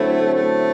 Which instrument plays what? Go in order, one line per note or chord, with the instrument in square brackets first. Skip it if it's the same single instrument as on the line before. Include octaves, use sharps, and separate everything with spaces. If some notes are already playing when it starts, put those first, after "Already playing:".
Already playing: [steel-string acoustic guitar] F#2 D3 F#3 C4 E4 [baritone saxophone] A3
[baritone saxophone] A3